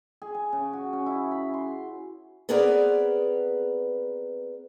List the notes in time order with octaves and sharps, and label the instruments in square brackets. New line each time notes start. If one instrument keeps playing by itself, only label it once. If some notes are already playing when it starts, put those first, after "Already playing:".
[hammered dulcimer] G#4
G#5
C#3
F#4
C#4
E4
B5
C6
[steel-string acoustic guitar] B3 C4 G#4 A#4 B4 D5